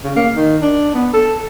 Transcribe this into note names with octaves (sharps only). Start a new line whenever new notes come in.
C#3
A#3
D#3
D4
B3
A4